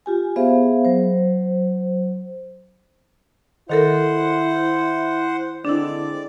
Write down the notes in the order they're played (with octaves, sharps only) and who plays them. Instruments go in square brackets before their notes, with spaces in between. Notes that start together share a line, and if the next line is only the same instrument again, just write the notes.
[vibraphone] F4 G4 G#5
B3 G#4 C5 E5 F5
F#3 C5
[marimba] D#3 A4 A#4 [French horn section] E4 [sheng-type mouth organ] C5 F#5
[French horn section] D3 G#3 C4 [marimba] D4 E4 [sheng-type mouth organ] D5